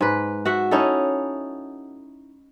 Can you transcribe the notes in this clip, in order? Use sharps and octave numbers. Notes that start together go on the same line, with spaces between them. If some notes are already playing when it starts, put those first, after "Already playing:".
G#2 B4
F#4 E5 F#5
C#4 D#4 E4 A4